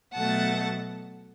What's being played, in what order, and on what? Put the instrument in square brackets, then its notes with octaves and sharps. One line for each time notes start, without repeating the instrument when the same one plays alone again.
[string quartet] B2 F#3 A3 F#5 A5